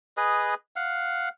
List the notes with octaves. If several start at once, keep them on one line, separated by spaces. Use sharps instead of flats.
G#4 B4 D#5
F5 F#5